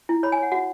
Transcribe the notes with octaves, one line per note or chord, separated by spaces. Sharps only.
E4
C#5 B5
G#5
C#5 F#5
F#4 F#5